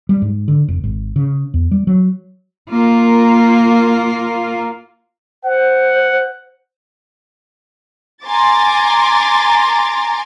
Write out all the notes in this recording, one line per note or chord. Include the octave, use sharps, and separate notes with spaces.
G3
G#2
D3
F1
G#1
C#3
E2
G3
F#3
A#3 F4 A#4
C5 F#5
G#5 A#5 C6 D6 A6